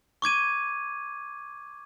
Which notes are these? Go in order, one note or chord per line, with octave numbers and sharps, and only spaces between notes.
C#6 D6 G#6 D#7